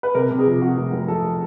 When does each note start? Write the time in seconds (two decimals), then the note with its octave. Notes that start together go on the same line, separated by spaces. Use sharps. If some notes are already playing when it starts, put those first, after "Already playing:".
0.03 B4
0.15 C3 A#4
0.31 C3
0.39 G#4
0.46 F2
0.61 C3 F#4
0.77 F1
0.93 F1
1.08 F1 A4